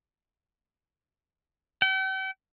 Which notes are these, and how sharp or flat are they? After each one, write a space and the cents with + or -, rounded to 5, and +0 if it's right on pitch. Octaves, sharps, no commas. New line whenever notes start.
G5 -45